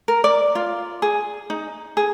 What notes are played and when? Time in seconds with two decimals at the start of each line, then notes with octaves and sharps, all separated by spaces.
0.08 A#4
0.24 D5
0.55 F4
1.02 G#4
1.50 D#4
1.97 G#4